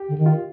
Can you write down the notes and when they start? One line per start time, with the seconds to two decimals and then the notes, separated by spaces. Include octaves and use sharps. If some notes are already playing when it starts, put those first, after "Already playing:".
Already playing: G4
0.09 D3
0.18 D#3
0.26 F4